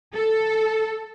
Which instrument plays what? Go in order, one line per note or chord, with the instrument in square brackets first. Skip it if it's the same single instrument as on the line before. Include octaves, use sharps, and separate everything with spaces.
[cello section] A4